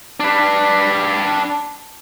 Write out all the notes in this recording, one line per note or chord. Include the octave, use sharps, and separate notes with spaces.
D4 B4